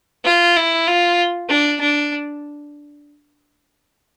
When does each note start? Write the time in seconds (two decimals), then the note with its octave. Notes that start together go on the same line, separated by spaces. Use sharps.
0.24 F4
0.56 E4
0.87 F4
1.49 D4
1.80 D4